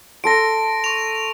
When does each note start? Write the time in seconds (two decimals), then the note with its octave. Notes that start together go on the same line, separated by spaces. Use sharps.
0.24 A4 C6 A#6 D7
0.84 C#6 F7